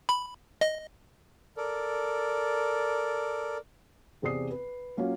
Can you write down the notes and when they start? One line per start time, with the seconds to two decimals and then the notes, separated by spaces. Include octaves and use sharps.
0.09 B5
0.61 D#5
1.57 A4 A#4 D5
4.22 E2 C3 G#4 D5 D#6 C7
4.51 B4
4.97 F#3 A#3 C#4 F4